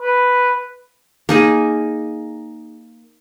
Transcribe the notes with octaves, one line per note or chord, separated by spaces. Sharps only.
B4
A#3 D#4 G#4